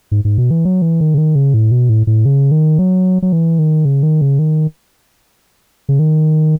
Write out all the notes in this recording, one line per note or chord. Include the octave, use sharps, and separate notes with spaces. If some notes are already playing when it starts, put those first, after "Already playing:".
G#2
G#2
B2
E3
F#3
E3
D#3
C#3
D#3
C#3
A2
B2
A2
A2
C#3
D#3
F#3
F#3
E3
D#3
C#3
D#3
C#3
D#3
C#3
D#3